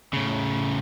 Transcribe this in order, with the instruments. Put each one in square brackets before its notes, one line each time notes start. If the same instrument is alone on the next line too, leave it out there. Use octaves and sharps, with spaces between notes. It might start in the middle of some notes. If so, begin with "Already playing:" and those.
[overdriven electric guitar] A2 C#3